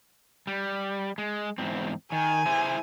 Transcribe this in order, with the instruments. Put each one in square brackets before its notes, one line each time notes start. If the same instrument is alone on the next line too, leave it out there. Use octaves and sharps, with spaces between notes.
[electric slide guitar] G3
G#3
E2 G#2 C4
[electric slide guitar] D#3 [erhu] G#5
[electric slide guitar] E4 G#4 C5